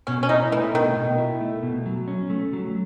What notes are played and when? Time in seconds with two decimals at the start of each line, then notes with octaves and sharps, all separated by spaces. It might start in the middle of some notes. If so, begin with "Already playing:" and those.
0.07 B2 C#4
0.23 C#4
0.29 D#4 E4
0.52 E3 A3
0.74 B2 D#3
0.96 B2
1.18 E4
1.41 A3
1.63 B2
1.86 F#3
2.08 C#4
2.30 A3
2.53 F#3